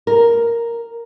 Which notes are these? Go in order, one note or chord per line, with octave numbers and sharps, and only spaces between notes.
A#4